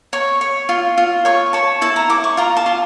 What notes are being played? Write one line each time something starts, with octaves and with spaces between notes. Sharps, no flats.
C#5 C#6
C#5
F4
F4
C#5 C#6
C#5 A5
E4 A5
A#5
E4 D6
C#6
F4 A#5
A5
F4